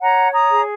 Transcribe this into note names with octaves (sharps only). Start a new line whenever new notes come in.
C#5 F#5 A#5
A#5 D#6
G#4